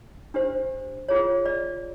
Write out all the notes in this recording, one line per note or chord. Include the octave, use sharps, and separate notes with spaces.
D4 G4 C5
F4 G#4 C#5
D5